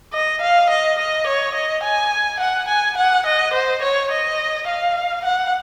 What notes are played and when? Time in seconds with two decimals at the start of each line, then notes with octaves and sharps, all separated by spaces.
0.13 D#5
0.41 F5
0.70 D#5
0.99 D#5
1.27 C#5
1.54 D#5
1.83 G#5
2.40 F#5
2.68 G#5
2.97 F#5
3.26 D#5
3.53 C5
3.82 C#5
4.11 D#5
4.68 F5
5.24 F#5